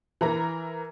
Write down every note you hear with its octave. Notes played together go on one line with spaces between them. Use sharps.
E3 A#4 A#5